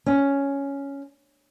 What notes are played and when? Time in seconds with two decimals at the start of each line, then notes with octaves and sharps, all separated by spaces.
0.06 C#4